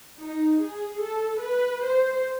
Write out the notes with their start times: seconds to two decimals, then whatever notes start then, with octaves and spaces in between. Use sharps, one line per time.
0.19 D#4
0.61 G#4
1.01 A4
1.42 B4
1.84 C5